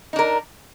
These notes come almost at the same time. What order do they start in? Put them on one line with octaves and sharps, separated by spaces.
D#4 D4 A#4